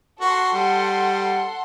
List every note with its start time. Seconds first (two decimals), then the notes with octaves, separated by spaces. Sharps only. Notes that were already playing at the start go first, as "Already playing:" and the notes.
0.21 F#4 A4 F#5 C6
0.54 G3